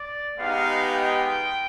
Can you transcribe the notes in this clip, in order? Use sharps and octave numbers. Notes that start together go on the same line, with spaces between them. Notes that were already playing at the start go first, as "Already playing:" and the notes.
Already playing: D5
G#3 B3 D#4 G4 F5
G5